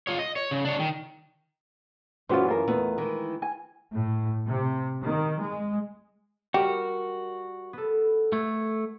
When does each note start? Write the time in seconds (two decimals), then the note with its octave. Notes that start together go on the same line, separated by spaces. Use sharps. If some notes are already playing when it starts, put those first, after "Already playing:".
0.07 F4 C#5
0.19 D#5
0.36 C#5
0.51 C#3
0.65 D4 C#5
0.79 D#3
2.29 F#2 E3 C#4 F4 F#4 C5
2.48 F4 A#4
2.67 E2 A3 B3
2.98 D#3 E3 G#3
3.42 G#5
3.92 A2
4.45 C3
5.03 D#3
5.39 G#3
6.54 G3 F#4 G4 A#4
7.73 B3 A4
8.33 A3 G#6